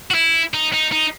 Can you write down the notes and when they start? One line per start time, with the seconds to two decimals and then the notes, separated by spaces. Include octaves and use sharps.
0.11 F#4
0.14 E4
0.54 D#4
0.73 D#4
0.92 D#4